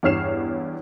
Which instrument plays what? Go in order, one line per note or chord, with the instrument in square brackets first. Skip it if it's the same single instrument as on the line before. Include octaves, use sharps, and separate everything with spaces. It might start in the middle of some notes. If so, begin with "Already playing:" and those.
[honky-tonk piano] E2 G2 C#5 F6 C7 E7